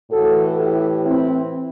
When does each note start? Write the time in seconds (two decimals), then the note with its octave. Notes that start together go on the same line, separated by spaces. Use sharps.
0.11 A2 E3 F#4 A4
0.57 E4 G4
1.05 C4 E4